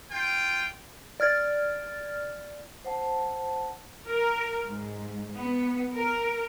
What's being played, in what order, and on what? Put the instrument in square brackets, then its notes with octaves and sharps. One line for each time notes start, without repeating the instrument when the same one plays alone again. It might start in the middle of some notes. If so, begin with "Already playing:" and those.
[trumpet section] F4 G5
[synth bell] D5 F6 G#6 A6
[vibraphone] C5 F#5 A5
[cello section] A#4
G#2
B3
A#4